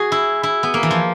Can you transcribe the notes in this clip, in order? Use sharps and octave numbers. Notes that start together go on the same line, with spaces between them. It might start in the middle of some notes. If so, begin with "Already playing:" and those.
Already playing: F#4 G#4
E4
E4
B3
A#3
E3
F3